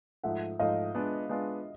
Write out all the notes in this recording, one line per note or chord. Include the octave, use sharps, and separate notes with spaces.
G#2 F3 A3 E5 F#5
G#2 F3 A3 D#5 F5
G#3 B3 D4 F4
G#3 B3 D4 F4